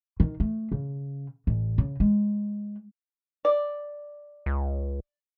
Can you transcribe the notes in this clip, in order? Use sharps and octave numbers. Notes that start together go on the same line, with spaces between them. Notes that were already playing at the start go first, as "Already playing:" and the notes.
D#3
A3
C#3
A1
C#3
G#3
D5
C#2